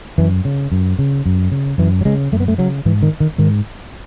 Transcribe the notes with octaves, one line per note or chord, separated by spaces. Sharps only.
F#2 E3
C#3
F#2
C#3
F#2
C#3
F#2 E3
F#3
C#3 G#3
F#2 A3
B3
A3
C#3 F#3
G#2 E3
D#3
D#3
G#2 D#3